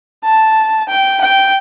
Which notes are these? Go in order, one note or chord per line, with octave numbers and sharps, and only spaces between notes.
A5
G5
G5